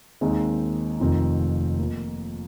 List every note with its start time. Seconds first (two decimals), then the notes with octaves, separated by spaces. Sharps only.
0.21 D#2 D#3 G#3 C4 D#4
1.00 F1 F2 D#3 C4
1.79 F2 F3 A#3